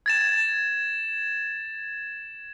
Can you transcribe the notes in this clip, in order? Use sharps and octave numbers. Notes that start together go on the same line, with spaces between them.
G#6 A6 E7